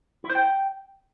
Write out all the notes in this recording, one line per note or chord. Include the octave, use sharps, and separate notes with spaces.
E4
C5
G5